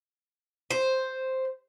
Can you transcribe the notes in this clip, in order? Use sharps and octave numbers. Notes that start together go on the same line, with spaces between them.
C5